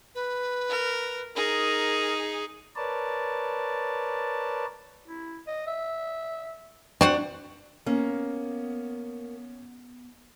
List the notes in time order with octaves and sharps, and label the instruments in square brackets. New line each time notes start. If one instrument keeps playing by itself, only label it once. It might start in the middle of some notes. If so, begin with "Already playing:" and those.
[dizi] B4
[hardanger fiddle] A#4
[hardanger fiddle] D#4 G#4 [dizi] A#4
[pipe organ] A#4 B4 C#5 D5 A5
[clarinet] E4
D#5
E5
[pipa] C4 F#4 F#5 [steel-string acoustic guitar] D4
[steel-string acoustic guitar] A#3 [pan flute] B3 [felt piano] C#4